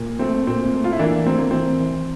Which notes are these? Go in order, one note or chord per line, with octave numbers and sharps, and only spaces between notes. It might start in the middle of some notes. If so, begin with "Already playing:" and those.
Already playing: A#2
A3 C4
A#2 C4
A3
F4
E4
E3 A#3 D4
A3 C4
A#3
E3 C4
E3